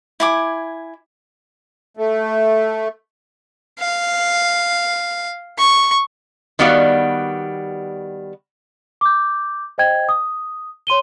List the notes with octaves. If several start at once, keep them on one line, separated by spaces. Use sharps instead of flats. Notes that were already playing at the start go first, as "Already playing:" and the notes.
E4 G#5 D6
A3
F5
C#6
D#3 G3 B3 F#4 D5 F5
D6 G6
C5 D#5 G5 G#6
D#6
C#5 C6 D#7 G7